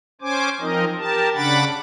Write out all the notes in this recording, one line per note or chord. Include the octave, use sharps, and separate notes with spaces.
C#4 C5 G#5 D6
F3 C4 D#4 A#4 D#5
G4 A#4 A5
C#3 D4 F#5 B5 D6 A6